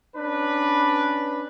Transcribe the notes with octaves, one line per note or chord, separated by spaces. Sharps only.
C#4 D4 B4